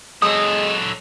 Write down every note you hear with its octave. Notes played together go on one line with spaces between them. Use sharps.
F#3 G#3 A4 D#6 E6